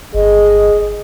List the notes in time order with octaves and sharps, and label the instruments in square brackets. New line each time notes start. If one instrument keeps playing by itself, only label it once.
[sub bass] G1 [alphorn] G#4 [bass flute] D#5